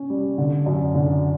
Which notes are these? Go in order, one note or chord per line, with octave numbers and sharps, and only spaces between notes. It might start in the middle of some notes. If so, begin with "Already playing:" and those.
Already playing: C#4
G3
D3
F#2
D3